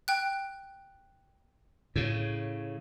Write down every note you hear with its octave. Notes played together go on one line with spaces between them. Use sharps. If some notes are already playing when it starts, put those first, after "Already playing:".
G5 F#6
A2 C#3